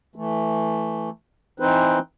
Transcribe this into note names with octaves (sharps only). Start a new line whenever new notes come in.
E3 A3
E3 C4 D#4 B4 C5